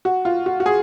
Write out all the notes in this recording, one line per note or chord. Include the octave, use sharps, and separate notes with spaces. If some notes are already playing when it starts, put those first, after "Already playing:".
F#4
F4
F#4
F#4
G#4